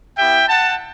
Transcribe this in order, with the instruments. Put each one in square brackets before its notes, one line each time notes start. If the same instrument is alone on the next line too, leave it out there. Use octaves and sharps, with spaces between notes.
[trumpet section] B3 E4 G4 E5 G5
F#5 A5